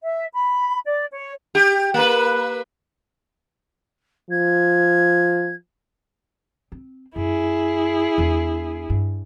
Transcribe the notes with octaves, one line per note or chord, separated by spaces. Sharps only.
E5
B5
D5
C#5
G4
A#3 B4
F3 G#6
C4
F#2 E4 G#4
E2 D4
G2